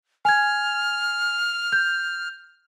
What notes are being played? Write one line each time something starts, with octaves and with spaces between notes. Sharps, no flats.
G#5 F6 G#6
G6